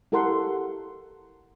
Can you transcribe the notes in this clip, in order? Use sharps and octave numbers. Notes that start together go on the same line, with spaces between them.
E4 G4 A4 A#4 F#5 C6